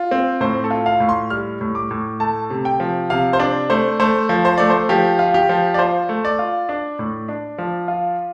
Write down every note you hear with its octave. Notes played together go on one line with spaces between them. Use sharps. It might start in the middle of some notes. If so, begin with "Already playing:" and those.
Already playing: F4
C4
A2 C5
A4
F4
F5
A2
C6
G3 F6
A2
D6
A2
A3 A5
C3
G5
F3
C3 F5
C5
D4 D5
A3 C5
A3 C5
F3
C5
A3 D5
C5
F3 G4
F4
G4
F3
D5
F4 C5
A3
D5
F4
D4
A2
D4
F3
F4